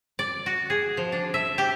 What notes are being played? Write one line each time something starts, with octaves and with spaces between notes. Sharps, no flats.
D5
F#4
G#4
F3
D4
E5
G4